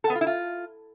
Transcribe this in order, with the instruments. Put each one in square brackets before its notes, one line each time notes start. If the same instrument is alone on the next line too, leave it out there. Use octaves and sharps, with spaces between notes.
[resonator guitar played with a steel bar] A4
B3
F4
E4
F4